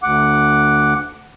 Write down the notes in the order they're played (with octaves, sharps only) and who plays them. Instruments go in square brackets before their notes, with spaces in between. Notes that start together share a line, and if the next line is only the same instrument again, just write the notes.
[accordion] D2 F#5 D6